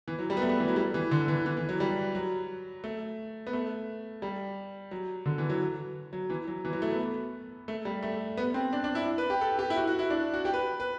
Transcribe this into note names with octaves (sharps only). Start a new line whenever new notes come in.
E3
F#3
G3
B3
A3
B3
E3
F#3
G3
E3
D3
E3
E3
E3
F#3
G3
F#3
A3
B3
A3
G3
F#3
D3
E3
F#3
F#3
E3
F#3
E3
F#3
A3
B3
A3
G3
A3
B3
C4
D4
D4
E4
B4
G4
A4
G4
E4
F#4
F#4
E4
D4
F#4
G4
B4
B4